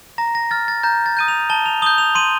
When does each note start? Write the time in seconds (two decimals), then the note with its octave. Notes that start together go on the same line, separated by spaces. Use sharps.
0.18 A#5 A#6
0.35 A#6
0.51 F6 A6
0.68 A6
0.83 A#5 G6
1.06 A6
1.17 D#6 G6 D#7
1.28 F7
1.50 A5 G7
1.66 F7
1.82 D#6 G6 G7
1.98 F7
2.15 C6 D#7